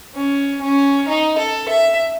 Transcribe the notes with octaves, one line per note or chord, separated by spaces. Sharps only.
C#4
C#4
D#4
A4
E5